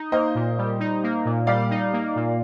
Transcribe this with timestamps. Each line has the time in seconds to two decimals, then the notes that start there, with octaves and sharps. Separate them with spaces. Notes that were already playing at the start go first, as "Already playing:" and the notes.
Already playing: D#4
0.12 A#3 C5 D#5
0.35 A#2
0.58 G3
0.80 D#4
1.03 A#3
1.25 A#2
1.47 G3 D5 F5
1.70 D#4
1.93 A#3
2.16 A#2